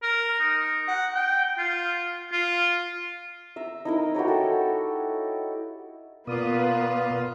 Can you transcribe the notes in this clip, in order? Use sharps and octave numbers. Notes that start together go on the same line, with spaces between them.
A#4
D#4
F#5
G5
F4
F4
E5 A#5
D#4 E4 A#4
F#4 G4 A#4 C#5
A4
B2 A#3 B3 F4 B4 D5 D#6